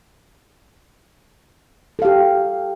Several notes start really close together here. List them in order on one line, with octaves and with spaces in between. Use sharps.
A4 F5 G4